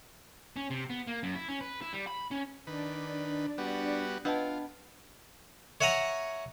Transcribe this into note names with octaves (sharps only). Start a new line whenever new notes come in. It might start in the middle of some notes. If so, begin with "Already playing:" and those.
C#4
C3
B3
A#3
F#2
E4
C#4
B4
E4
G3
B5
C#4
D#3 D4 B4 D5
G3 B3 F#4
B3 D4 F4 D#5 A5
C#5 E5 F#5 G#5 A#5